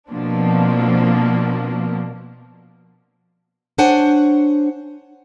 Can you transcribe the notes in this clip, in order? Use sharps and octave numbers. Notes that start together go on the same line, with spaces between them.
B2 F3 A#3 C4 D4
D4 C5 C#5 F#5 G#5